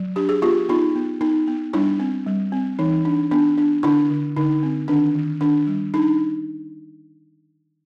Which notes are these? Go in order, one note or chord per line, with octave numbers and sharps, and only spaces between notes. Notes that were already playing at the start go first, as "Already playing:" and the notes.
Already playing: F#3
D4 G4
G#4
B3 F4 G4
B3 D#4 F4
B3
B3 D#4
B3
G3 D4 E4
C4
G3
C4
E3 D#4
D4
B3 D4
D4
D3 D4 E4
D3
D3 D#4
C4
D#3 D4
D#3
D#3 D4
G3
D4 D#4